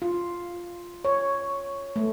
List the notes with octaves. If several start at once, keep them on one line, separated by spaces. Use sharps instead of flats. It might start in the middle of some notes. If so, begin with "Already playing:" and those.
F4
C#5
A3